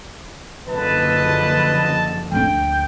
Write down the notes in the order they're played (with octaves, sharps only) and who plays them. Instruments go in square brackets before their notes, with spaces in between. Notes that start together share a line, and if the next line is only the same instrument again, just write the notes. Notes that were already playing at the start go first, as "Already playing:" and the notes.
[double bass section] F#1 D3 F3 [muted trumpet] B4 [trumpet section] D#5 A5
[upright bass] D2 D4 [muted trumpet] G5